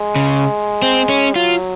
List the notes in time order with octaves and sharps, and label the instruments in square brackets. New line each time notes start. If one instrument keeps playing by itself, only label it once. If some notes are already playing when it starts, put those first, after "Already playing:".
Already playing: [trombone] G#3
[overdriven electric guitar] C#3
C4
C#4
[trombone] F#3 [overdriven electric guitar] F4